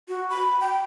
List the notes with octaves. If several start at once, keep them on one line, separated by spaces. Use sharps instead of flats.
F#4
B5
G5